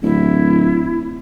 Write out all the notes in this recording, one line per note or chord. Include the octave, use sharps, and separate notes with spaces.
D1 E4